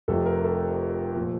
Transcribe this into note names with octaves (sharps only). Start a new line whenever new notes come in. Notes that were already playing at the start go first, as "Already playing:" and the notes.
F1 F2 C3 F3 A4
A#4
A4
A#2 F3